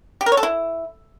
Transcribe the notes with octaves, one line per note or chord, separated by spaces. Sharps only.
G4
A#4
C#5
A4
E4